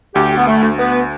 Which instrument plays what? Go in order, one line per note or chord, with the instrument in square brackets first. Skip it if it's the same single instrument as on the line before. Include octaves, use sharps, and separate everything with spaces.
[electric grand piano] D2 [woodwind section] G4
[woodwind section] B3
A3
[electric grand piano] D2
[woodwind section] B3